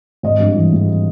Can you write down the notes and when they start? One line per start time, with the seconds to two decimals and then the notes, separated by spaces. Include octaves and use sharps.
0.23 G#1 D#5
0.40 G2
0.55 E3
0.73 G#1